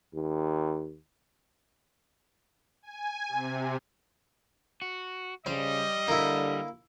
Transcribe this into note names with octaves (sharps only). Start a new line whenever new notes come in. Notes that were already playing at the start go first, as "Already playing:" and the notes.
D#2
G#5
C3
F#4
C#3 G3 C5 D#5
D3 A#3 E4